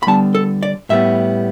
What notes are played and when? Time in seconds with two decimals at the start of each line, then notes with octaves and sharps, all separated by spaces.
0.03 B5
0.07 D3 G3 B3 A5
0.35 A4
0.63 D5
0.89 A2 G3 B3 E5